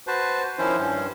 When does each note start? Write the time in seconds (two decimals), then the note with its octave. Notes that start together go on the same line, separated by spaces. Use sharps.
0.07 F#4 B4 C5 A5
0.58 D#3 F3 C#4 E4 C5
0.78 G2 C#4